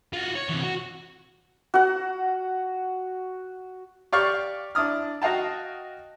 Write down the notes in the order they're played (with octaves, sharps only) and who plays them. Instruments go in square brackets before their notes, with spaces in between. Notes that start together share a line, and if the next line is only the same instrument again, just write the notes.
[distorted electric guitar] F4 F#4
C#5
C3 E3
F#4
[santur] F#4 F#5
[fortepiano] G4 D5 F5 C#6 F6
D4 E4 D#6 F6
F#4 D#5 F5 G5 A5